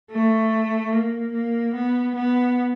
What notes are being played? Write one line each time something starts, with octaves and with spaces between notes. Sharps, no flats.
A3
A#3
A#3
B3
B3